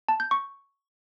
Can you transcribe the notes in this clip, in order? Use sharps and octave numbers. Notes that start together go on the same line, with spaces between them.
A5
G6
C#6